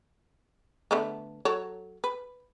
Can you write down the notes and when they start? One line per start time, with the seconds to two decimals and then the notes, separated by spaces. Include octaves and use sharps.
0.91 D3 A3 B3
1.45 F#3 A4 C#5
2.04 B4